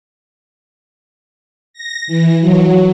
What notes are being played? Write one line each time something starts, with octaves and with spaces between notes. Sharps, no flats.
A#6
E3
F#3